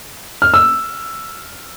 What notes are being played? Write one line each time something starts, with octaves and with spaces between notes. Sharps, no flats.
F6
E6